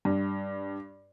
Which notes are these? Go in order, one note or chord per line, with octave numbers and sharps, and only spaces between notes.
G2